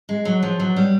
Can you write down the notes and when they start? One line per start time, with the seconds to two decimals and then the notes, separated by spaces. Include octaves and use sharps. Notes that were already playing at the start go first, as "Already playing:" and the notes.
0.09 G#3
0.25 F#3
0.43 F3
0.60 F#3
0.76 G3